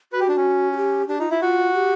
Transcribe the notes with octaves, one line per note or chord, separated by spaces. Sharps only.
F#4 B4
G4
D4
C#4
F#4
G4
D4 G4
D#4 F4
E4 F4
F4 F#4
G4